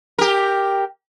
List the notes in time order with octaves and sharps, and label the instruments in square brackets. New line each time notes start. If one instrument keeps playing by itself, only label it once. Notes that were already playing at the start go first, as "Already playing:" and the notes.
[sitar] G4 A#4